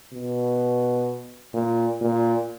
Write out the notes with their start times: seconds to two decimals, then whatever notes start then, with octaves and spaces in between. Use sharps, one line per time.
0.13 B2
1.54 A#2
2.01 A#2